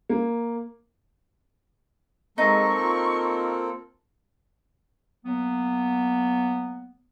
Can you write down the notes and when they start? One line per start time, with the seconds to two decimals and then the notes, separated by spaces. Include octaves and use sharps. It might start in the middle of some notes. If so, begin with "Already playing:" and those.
0.09 A#3
2.38 G#3 A#3 C4 D#4 A4 C#6
2.78 F4
5.25 F#3 A#3 B3